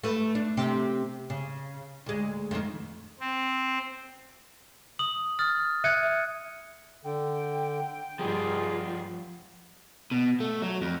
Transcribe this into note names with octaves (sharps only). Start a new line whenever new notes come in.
A3 B4
D4
C3 C4 G4
C#3
D2 G#3
F2 D#3
C4
D#6 F#7
D#6 F6 A6
E5 F#6 G#6 C#7 D#7
D3 G5
G2 F3 F4 G4 G#4
B2
A3
F#3
F2